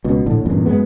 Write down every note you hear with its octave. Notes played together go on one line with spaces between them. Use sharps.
C#2 B2
A#1 A2 D3
A1 E2 G2 A#2
F#2 G#3 B3